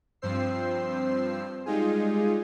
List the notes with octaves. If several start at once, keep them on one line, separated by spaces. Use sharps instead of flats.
G2 F3 C4 C5 E6 C7
G3 G#3 D#4 F4 G#4